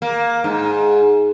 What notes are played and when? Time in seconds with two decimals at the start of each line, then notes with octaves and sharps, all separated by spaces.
0.02 A#3
0.44 G#2